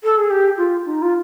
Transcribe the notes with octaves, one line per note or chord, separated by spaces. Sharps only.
A4
G#4
G4
F4
D#4
F4